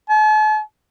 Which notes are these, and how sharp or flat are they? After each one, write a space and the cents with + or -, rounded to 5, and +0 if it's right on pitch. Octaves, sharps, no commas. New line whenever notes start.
A5 -45